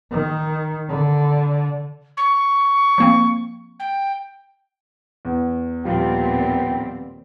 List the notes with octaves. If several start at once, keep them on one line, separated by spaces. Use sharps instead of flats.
D#3
D3
C#6
F3 A#3 C4
G5
E2
D#2 A#2 F3 G3 B3 C4 F4 G5